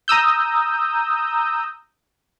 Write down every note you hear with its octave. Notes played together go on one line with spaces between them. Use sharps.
A#5 D#6 E6 G6